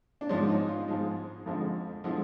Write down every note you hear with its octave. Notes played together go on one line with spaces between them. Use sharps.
D4
G#2 F3 G#3 C#4
D#4
F4
G#2 F3 G#3
F2 D3 F3 G#3
D3 F3 G#3 E4